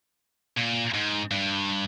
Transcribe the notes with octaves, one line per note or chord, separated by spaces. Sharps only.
A#2
G#2
G2